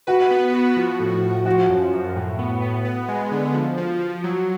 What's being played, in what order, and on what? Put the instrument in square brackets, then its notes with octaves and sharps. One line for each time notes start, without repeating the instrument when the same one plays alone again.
[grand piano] F#4 [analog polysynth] B4
[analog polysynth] B3
F#4
F3
A2
A2
[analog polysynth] F3 [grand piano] F#4
[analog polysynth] F#2
F#2
A2
B3
B3
B3
G#3
D3
F3
F3
F3
F#3